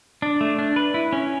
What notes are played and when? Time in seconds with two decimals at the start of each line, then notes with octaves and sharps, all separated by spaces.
0.22 D4
0.41 A3
0.59 D4
0.76 B4
0.94 E4
1.13 C#4